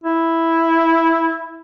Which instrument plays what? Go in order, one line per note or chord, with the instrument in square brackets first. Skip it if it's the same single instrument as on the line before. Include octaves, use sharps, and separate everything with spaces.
[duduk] E4